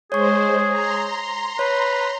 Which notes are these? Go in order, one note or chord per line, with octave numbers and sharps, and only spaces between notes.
G#3 G#4 C5 C#5 C#6
A#5 C6
B4 C#5